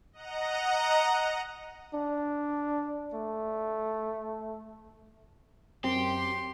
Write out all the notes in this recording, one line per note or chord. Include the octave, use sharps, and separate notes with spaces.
D#5 F#5 A#5
D4
A3
F#2 C4 G4 C6